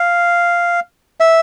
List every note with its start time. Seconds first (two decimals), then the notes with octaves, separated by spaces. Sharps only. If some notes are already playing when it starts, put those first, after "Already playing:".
Already playing: F5
1.20 E5